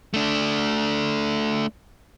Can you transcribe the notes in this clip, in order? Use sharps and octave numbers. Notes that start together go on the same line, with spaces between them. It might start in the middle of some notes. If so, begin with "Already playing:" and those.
A3 D4